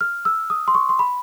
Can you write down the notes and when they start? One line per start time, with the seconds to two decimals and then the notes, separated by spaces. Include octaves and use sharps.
0.01 F6
0.25 E6
0.50 D#6
0.68 C6
0.75 C#6
0.89 C6
0.99 B5